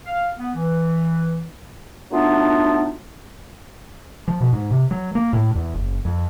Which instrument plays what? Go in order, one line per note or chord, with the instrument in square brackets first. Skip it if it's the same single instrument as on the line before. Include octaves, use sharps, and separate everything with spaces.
[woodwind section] F5
B3
E3
F#3 A3 B3 D4 D#4 F4
[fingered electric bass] F3
B2
G#2
C3
F#3
A#3
A2
E2
F#1
F2